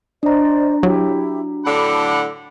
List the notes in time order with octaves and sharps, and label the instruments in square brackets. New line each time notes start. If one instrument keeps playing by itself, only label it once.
[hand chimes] D4 A#5 [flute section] C5 D5 D#5
[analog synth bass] F#3 [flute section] E4 G4
[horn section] A2 D3 F#5 [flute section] A5 B5 D6